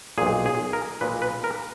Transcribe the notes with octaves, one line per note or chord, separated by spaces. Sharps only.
B1 A#2 G#4
G#4
A#4
B1 A#2 B4
B4
A#4